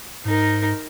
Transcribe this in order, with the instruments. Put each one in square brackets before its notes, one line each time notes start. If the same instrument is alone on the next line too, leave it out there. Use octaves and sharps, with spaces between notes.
[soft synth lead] G#2 [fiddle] D#4 A#4